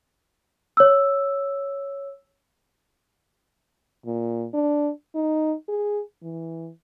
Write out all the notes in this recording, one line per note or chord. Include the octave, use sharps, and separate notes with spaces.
C#5 E6
A#2
D4
D#4
G#4
E3